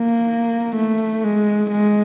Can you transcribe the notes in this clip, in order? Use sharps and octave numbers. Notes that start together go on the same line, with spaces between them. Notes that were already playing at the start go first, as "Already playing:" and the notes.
Already playing: A#3
A3
G#3
G#3